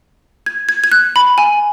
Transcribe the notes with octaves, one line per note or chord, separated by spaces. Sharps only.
G#6
G#6
G#6
F#6
B5
G#5